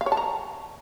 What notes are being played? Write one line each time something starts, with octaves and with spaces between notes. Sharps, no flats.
F5
C#5
A5
A#5